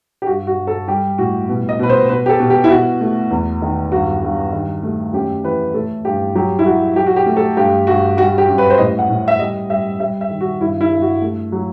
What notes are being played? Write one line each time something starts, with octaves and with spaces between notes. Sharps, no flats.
G4
G2 F#4
F#4
G2
A4
G3 G4
A2 F#4
B2
D#5
B2 B4
C5
B2 B4
G4
A4
B2
G4
E4
B2 F#4
A3
E2
D#3
G2 F#4
G2
D#3
A3
F#2 G4
E3 B4
A3 A4
G2 G4
F#3 G4
E4
F#3 F#4
F#3 G4
F#4
G4
A3
A4
G2 G4
G2 F#4
G3 F#4
G4
F#2
B4
C5
A2 D#5
F#5
A2
E5
G3 D#5
G3 E5
G3 E5
E5
D#3
F#4
G2 E4
E4
G2
F#4
A3
F#3